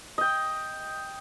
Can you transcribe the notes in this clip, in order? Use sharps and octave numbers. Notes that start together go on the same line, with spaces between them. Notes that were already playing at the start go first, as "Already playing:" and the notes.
D#5 G5